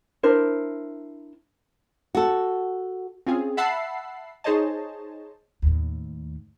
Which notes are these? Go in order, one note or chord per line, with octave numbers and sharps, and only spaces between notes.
D4 E4 A#4 C5
F#4 A4
C4 C#4 F4 G#4
E5 F#5 A5 B5 E6 C7
D#4 G#4 C5 C#5 D#5 A5
D#2 A2